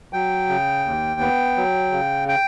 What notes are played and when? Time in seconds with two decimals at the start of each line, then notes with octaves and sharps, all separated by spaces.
0.13 F#3 G5
0.49 C#3
0.85 D#2
1.20 B3
1.57 F#3
1.92 C#3
2.28 G5